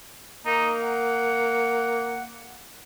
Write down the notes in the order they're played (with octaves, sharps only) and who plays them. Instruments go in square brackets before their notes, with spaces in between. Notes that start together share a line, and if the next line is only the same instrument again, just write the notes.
[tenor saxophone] A#3 [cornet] D#4
[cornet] F#5